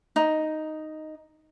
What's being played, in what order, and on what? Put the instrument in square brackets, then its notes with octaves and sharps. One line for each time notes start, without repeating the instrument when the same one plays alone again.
[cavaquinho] D#4